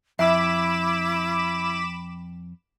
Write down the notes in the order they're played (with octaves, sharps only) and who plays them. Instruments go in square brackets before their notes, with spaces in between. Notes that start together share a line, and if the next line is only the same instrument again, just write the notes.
[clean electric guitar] F2 [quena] E4 [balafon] E5 [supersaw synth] B5 D6 E7